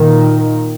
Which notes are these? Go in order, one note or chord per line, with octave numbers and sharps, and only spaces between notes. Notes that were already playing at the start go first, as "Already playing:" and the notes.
Already playing: A#2 D#3